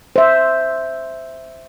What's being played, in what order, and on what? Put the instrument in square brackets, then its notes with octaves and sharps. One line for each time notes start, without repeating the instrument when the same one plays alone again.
[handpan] C5 E5